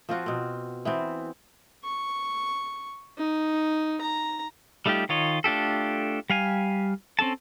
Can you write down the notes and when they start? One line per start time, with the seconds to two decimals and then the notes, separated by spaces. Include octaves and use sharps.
0.09 F3 C4 F4 F#4
0.26 B2 C4
0.85 E3 B3 C4
1.85 C#6
3.18 D#4
4.01 A#5
4.86 G3 A3 D#4 F4 G4
5.09 D#3 F4 C#5 D#5
5.44 A3 D4 F4 G4 A4
6.30 G3 F5 G#5
7.19 C4 C#4 A4 A5